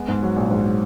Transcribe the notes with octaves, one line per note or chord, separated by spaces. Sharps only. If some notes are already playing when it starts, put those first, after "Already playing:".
Already playing: G#3 B3
G#2
F#3
A#1
G#2
F#3